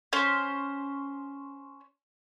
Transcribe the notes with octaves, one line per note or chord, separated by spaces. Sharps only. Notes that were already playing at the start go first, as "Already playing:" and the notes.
C#4 C5